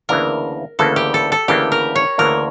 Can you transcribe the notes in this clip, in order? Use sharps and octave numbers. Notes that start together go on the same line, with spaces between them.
D2 C#3 E3 A#3 D4 A#4
D2 C#3 E3 A#3 D4 A4
G4
A4
A4
D2 C#3 E3 A#3 D4 G4
A#4
C#5
D2 C#3 E3 A#3 D4 A#4